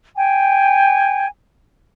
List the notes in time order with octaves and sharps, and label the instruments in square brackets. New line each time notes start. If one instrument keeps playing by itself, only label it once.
[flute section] G5 G#5